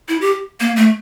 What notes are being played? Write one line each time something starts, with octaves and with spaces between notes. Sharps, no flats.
E4
G4
A#3
A3